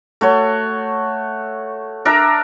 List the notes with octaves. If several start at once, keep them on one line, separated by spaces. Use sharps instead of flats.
A3 F#4 C#5
D4 A#4 E5 A#5